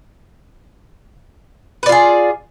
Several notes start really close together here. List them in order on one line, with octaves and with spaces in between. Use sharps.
B4 D5 F4 G#4